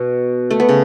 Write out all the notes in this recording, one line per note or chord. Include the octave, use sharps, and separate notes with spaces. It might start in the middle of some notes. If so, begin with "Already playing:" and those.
Already playing: B2
A3
B3
C#3